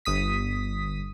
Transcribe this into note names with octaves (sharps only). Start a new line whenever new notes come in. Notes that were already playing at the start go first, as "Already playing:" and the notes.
G1 D#6 B6